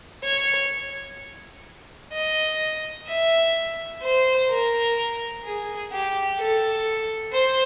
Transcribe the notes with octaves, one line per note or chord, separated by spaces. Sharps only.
C#5
D#5
E5
C5
A#4
G#4
G4
A4
C5